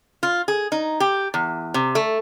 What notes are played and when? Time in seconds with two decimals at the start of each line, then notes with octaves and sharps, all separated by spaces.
0.23 F4
0.48 G#4
0.72 D#4
1.00 G4
1.34 E2
1.74 C3
1.95 A3